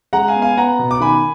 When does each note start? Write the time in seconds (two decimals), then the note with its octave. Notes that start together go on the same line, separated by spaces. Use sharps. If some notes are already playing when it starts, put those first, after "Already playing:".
0.13 G#3 F#5 A#5
0.28 F5 G#5
0.36 B3
0.42 F5 G#5
0.57 B3 F#5 A#5
0.79 B2
0.91 D6
1.00 D#3 G#5 B5